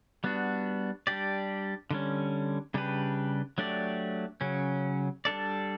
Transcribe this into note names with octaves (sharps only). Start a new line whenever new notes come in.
G3 B3 D4 F#4
G3 D4 G4 D5
D3 G3 C#4
C#3 G3 D4 G4 B4
F#3 A3 D4 G4 D5
C#3 F#3 C#4
G3 D4 A4 D5